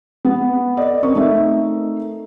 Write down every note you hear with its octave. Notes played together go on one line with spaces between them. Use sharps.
B3
A4 D5 D#5
C4 C#4 A#4 D#5 C#6
A3 C4 D#4 A#4 E5